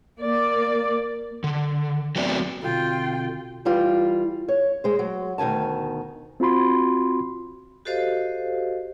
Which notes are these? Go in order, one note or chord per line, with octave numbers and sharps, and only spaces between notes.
A#3 D5
D3
F#3 A3 B3 C4 D5
B2 D3 C4 F4 G5
E3 G3 F4
C#5
G#3 C5
F#3
D2 B2 D#3 G#5 A5
C4 F4 F#4 B5 C6
F#4 G4 A4 C5 D#5 F5